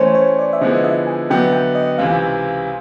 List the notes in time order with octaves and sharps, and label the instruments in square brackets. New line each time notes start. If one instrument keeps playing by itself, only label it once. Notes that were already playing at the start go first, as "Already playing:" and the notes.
Already playing: [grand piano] E3 A3 C#4 [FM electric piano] C5 C#5
[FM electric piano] C#5
D5
E5
[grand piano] D3 F3 G#3 B3 E4 [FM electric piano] D#5
[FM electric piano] D#5
E5
G#5
[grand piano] D3 F#3 B3 [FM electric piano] G5
[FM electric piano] G5
D#5
[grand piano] C#2 C3 E3 [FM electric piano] F5